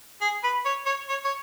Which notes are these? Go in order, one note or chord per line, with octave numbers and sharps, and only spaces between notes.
G#4
B4
C#5
C#5
C#5
C#5